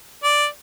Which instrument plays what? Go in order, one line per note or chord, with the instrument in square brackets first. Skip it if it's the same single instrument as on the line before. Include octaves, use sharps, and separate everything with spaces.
[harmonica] D5